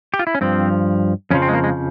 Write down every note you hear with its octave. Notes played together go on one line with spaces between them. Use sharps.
G4
F4
E4
C#4
G2 F3 C4
F2 C#3 F3 C#4
C4
G#3
A#3
G#3